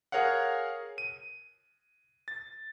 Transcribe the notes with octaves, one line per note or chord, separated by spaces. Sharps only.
G#4 A#4 C#5 F5 F#5
D#7
A6